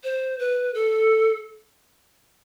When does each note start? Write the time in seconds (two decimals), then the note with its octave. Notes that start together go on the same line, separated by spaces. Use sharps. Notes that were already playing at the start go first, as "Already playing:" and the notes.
0.04 C5
0.39 B4
0.74 A4